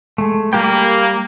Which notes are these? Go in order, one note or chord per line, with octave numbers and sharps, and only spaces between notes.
G#3 A3
G3 A#3 G4 G5